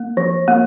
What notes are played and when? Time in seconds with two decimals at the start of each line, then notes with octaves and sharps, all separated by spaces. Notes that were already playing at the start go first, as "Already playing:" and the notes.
Already playing: A#3
0.17 F3
0.48 A#3